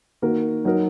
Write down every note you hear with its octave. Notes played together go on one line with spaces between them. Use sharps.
D#3 A#3 F#4 A#4
F#3 D#4 F#4 A#4